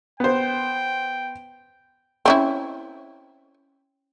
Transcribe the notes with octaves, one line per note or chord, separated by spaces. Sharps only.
B3 C5 G5
C4 C#4 E4